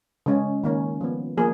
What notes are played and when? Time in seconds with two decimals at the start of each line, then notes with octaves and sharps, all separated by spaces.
0.26 C#3 G#3 C#4
0.64 D#3 A#3 C#4
1.01 F3 B3
1.37 F3 A#3 G#4